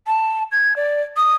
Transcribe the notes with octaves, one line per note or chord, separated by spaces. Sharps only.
A5
G#6
D5
D#6